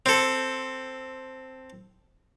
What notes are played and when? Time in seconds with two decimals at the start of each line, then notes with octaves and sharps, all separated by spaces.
0.06 C4 A4